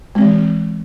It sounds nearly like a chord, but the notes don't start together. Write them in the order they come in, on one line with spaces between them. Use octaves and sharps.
G#3 C4 E3